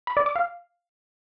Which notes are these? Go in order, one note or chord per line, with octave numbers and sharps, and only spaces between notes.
B5
D5
D6
F5